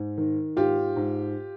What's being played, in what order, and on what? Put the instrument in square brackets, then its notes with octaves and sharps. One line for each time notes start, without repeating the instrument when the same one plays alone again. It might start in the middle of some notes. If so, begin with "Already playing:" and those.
Already playing: [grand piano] G#2
D#3
G#2 F4 G4
G#2